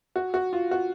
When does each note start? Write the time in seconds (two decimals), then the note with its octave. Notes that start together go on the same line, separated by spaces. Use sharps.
0.16 F#4
0.34 F#4
0.53 F4
0.71 F#4